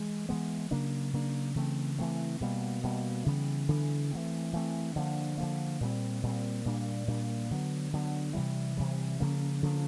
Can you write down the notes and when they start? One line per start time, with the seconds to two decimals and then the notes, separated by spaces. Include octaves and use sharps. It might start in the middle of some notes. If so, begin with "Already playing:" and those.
Already playing: E3 G#3
0.29 E3 G#3 B3
0.71 C#3 F#3 A#3 D4
1.13 C#3 F#3 A#3 D4
1.55 C#3 E3 A3 C4
1.98 C#3 E3 A3 C4
2.41 B2 G3 A#3
2.83 B2 G3 A#3
3.26 C#3 E3 G3 B3
3.68 C#3 E3 G3 B3
4.11 E3 A3 C4
4.53 E3 A3 C4
4.96 D3 F3 A#3
5.38 D3 F3 A#3
5.81 A#2 G3 C4
6.23 A#2 G3 C4
6.65 A#2 G3 A#3 D4
7.08 A#2 G3 A#3 D4
7.51 D3 F#3 B3
7.93 D3 F#3 B3
8.35 C3 E3 G3
8.77 C3 E3 G3
9.20 C#3 F3 A#3 C#4
9.62 C#3 F3 A#3 C#4